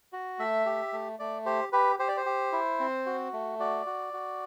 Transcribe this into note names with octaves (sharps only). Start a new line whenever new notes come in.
F#4
A3 E5
G4
A3
A3 D5
G4 C5
G4 B4
G4 C5
D5
C5
G4
E4
C4
F#4
A3
F#4 D5
F#4
F#4